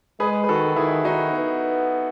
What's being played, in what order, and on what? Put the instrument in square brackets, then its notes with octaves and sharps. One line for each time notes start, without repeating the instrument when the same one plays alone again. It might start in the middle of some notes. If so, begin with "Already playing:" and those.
[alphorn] G#3 [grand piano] G#4 B4
[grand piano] B4
[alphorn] D#3 [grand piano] F#4 A4
[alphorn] D#3 [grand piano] E4 G#4
[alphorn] D#3 [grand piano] D#4 F#4
[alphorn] B3